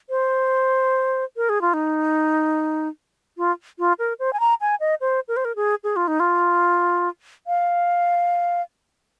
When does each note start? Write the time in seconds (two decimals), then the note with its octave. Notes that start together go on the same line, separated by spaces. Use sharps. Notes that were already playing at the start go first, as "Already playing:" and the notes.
0.10 C5
1.37 A#4
1.49 G#4
1.61 F4
1.74 D#4
3.37 F4
3.79 F4
3.99 A#4
4.19 C5
4.33 G#5
4.40 A#5
4.61 G#5
4.80 D#5
5.01 C5
5.28 A#4
5.37 C5
5.45 A#4
5.56 G#4
5.84 G#4
5.96 F4
6.08 D#4
6.20 F4
7.47 F5